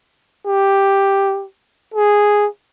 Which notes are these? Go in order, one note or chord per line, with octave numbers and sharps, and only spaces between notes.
G4
G#4